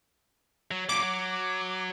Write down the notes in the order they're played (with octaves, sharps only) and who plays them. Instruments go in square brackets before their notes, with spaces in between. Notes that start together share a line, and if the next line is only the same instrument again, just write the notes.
[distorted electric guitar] F#3
[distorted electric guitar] A#2 F#3 [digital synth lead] D6
[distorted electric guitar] F#3